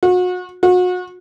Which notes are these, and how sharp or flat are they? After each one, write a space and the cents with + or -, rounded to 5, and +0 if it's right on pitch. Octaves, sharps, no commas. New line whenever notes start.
F#4 -35
F#4 -35